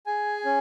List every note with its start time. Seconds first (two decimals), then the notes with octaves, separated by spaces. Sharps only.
0.06 G#4 G#5
0.45 C#4